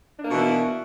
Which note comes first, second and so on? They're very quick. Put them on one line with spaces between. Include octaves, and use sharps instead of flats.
D4 A#3 B2 E3 E4